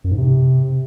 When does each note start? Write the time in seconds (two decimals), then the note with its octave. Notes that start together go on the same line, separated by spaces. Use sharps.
0.04 F#2
0.11 G#2
0.18 C3